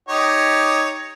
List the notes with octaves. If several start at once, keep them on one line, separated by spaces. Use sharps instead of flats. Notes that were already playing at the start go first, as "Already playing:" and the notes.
D#4 G4 C#5